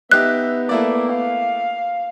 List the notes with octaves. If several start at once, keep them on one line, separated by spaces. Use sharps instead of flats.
B3 D#4 G4 E5 F#6
A3 A#3 E4 D5
F5